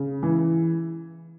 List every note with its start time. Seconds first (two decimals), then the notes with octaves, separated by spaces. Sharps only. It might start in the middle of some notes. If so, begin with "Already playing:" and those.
Already playing: C#3
0.23 E3